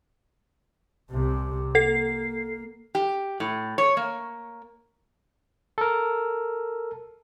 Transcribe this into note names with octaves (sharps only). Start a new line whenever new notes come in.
C2 C3
A#3 A4 C7
G4
A2
C#5
A#3
A4 A#4